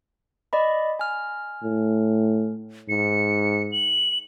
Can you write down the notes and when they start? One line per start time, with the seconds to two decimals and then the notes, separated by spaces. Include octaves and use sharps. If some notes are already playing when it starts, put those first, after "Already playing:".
0.53 D5 D#5 B5
0.99 G#5 F6
1.64 A2
2.89 G#2 C#7
3.72 F#7